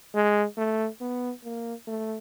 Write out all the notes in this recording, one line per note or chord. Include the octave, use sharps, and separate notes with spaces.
G#3
A3
B3
A#3
A3